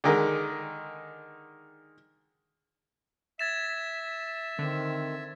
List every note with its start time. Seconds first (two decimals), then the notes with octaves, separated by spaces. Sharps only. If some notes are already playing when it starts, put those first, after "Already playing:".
0.04 D3 D#3 G#3
3.39 E5 G#6 A6 B6 E7
4.59 D3 D#3 C4